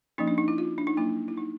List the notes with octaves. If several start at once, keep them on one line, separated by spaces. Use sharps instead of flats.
F3 A#3 C#4 D#4
D4
D#4
E4
F4
D4
D#4
F#3 A#3 D4 E4
E4
D#4